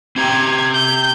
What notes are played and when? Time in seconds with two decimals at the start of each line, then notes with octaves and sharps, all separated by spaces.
0.16 C4 G4 A#5 G#6
0.73 G6